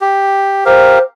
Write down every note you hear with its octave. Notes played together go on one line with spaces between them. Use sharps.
G4
G4 A#4 C5 F5